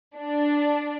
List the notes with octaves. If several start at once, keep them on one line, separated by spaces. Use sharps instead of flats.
D4